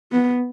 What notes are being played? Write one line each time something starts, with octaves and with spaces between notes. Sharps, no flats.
B3